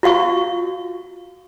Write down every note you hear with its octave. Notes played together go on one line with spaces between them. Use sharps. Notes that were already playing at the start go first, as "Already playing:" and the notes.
F4 F#4 F5 C#6